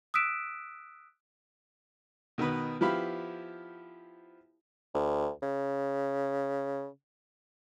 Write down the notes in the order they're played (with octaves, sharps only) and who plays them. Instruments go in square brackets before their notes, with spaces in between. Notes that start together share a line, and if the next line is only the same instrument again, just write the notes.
[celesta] D#6 E6 F#6 B6 D7 E7
[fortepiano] B2 D#3 B3 B4
F3 B3 E4 G4 F5 B5
[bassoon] D2
C#3